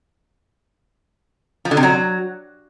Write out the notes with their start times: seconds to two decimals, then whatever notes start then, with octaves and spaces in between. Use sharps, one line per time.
1.65 F3
1.71 D3
1.77 C3
1.83 F#3